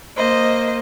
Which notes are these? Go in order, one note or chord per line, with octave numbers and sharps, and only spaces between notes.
A#3 C5 D#5